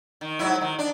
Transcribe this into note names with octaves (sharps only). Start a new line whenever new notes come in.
D#3
G#2 F#3 E4
D#3
D4